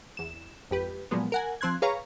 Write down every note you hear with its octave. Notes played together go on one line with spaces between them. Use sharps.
E2 E7
G#1 F2 G4 B4
A#2 F3 F#3 G#3 B3
A#4 F#5 G#5
F3 C4 C6 F#6 G#6
G#4 B4 C#5 F5 A#5 C#6